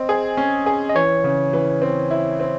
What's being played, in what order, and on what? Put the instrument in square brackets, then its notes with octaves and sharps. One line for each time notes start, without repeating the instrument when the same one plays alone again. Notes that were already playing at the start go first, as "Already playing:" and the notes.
Already playing: [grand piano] C4 [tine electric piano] D#5
[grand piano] G#4
C#4
G#4
[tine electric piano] D#5
[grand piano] E3 [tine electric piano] C#5
[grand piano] C#3
E3
C4
E4
C4